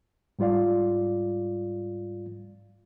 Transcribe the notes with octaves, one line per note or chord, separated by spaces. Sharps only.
G#2 G3 F4 D5 F5